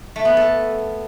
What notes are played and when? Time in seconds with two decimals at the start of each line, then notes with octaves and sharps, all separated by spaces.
0.16 A3
0.25 B3
0.37 A4